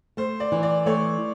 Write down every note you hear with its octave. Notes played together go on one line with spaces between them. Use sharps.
A3 C5
D5
E3
D5
A3 C#5